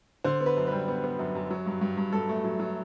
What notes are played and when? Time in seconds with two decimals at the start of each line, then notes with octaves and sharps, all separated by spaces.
0.24 D3 C5
0.41 B3
0.46 B4
0.57 F#2
0.67 G3 B4
0.88 B3
1.04 B3
1.19 F#2
1.35 F#2
1.51 F#3
1.66 G2
1.81 G2
1.97 G2
2.12 G2 A4
2.29 A3
2.44 F#3
2.60 F#3